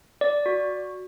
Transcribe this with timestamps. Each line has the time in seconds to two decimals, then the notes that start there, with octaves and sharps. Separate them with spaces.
0.21 D5
0.46 F#4